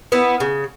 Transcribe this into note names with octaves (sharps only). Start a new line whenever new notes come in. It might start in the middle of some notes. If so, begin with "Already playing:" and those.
B3 E4
C#3